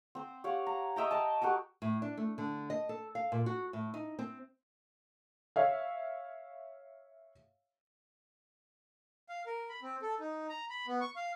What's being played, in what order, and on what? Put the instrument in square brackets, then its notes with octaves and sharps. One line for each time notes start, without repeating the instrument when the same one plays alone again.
[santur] C4 C5
G4 C#5 F5 F#5
A#5
D#5 E5 G5 A#5
D#5 A5
F#4 G4 A4 A#4
[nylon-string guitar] A2
D4
A3
D3
D#5
A4
F5
A#2
F#4
A2
D#4
C4
[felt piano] C#5 E5 F5
[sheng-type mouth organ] F5
A#4
B5
C4
A4
D#4
A#5
B5
B3
C#6
F5